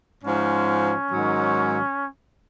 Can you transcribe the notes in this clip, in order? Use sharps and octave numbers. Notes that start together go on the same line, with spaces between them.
G#2 F3 C#4
G#2 D#3 F#3